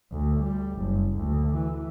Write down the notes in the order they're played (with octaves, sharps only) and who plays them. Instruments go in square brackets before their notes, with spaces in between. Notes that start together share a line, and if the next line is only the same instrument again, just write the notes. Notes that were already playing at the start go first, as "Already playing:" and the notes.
[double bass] D2
G3
F#1
D2
E3